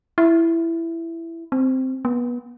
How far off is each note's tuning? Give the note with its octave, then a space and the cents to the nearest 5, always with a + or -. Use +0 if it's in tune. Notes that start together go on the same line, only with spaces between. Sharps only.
E4 +10
C4 -5
B3 -25